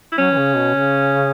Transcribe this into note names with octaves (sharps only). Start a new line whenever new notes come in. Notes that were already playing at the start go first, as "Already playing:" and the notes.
E4
F#3 C#4
E3
C#3
B2
C#3